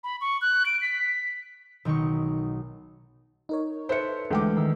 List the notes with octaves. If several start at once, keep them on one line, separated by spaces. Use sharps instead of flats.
B5
C#6
F#6
D7
B6
B1 D#3 D#4 C#6
D#4 A#4 C#5
A4 B4 C5 E5 C#7
D2 E3 G#3 G5 D6
D#3 E6